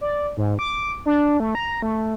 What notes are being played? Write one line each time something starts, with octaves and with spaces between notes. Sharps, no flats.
D5
G#2
D6
D4
A3
A#5
A3